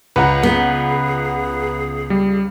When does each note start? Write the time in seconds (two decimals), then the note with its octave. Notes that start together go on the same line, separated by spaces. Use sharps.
0.16 C#2 B4 F#5 A#5
0.43 B3 G#4
2.10 G3